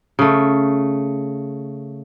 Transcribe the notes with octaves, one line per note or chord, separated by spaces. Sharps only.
C#3 A3